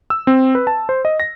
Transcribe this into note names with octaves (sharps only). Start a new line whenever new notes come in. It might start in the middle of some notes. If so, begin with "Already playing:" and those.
E6
C4
B4
A5
C5
D#5
A#6